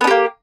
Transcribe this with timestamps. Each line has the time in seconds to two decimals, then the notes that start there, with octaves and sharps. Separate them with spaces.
0.01 B3
0.04 D4
0.07 G4
0.11 A#3